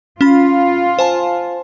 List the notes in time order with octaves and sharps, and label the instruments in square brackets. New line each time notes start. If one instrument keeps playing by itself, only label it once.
[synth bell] C#4 B5 [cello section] F4
[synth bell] C5 G#5 A5